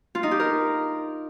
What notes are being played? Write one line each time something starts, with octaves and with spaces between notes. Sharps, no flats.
F4
D#4
G4
A#4